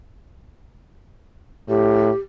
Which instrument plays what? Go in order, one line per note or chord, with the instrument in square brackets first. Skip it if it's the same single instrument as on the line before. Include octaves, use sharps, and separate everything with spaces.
[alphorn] A2 [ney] G4